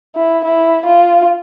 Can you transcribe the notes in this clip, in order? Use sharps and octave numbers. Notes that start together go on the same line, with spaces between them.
E4
E4
F4